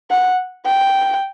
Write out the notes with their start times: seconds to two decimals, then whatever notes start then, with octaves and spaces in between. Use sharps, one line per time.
0.11 F#5
0.66 G5